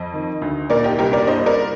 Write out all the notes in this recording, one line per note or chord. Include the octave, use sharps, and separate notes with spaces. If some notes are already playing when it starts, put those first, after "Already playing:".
Already playing: F2 D#5
D#3
D2
A#2 A#4 D5
D#4 G4
C2 G4 A#4
A#4 D5
G2 C5 D#5
A#4 D5